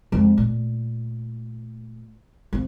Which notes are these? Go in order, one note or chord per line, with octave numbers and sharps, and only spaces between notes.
F2 G#3
A#2 A3
F3 C4